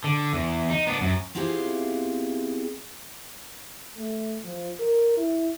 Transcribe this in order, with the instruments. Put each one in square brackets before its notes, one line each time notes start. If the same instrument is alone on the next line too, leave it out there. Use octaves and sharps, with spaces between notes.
[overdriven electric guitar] D3
E2
D#4
B3 D4
F#2
[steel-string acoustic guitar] B3 C4 E4 F4 G4 G#4
[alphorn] A3
F3
A#4
E4